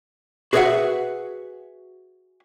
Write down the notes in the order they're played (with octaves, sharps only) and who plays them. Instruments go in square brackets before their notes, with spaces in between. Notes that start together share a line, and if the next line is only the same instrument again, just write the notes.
[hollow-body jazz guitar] F#4 G#4 B4 D5 E5 F#5